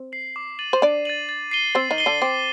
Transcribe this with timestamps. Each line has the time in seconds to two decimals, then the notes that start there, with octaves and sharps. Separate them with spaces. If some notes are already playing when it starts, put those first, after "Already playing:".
Already playing: C4
0.12 C7 F#7
0.36 D6
0.59 A6 D#7 F#7
0.73 C5
0.82 D4 D5 D6
1.05 A6 D#7 F#7
1.29 A6
1.51 C7 D#7 G7
1.75 C4 C5 A6
1.91 D#3 D#4
1.98 C7 D#7 G7
2.06 D3 D4
2.22 C4 D6